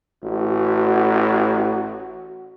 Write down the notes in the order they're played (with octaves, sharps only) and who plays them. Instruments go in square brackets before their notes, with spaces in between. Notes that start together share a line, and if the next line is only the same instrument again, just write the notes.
[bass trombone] A1 [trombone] F#4